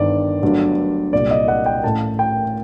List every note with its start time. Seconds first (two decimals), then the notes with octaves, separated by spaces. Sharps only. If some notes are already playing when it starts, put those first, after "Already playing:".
Already playing: G1 G2 D#3 D5
0.42 G1 G2 F#3 A3
1.13 C2 A#2 G3 D5
1.31 D#5
1.48 F#5
1.66 G5
1.84 A1 A2 A3 A5
2.19 G5